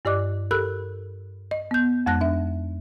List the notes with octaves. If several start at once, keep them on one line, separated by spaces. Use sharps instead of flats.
G2 G4 D5 D#5 D6 F#6
G4 A4 A#4 B5 E6 F#6
D#5
B3 G6
F2 G#3 A5 F#6 A#6
D4 E5